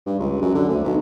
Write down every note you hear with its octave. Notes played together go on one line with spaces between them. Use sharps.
G2
C#2
F#2
D3
D2
B1